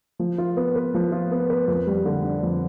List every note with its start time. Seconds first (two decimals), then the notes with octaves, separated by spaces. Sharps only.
0.19 F3
0.38 F4
0.57 B3
0.75 B4
0.94 F3
1.12 F4
1.31 B3
1.50 B4
1.68 F2
1.87 G3
2.06 D3
2.24 D4
2.43 F2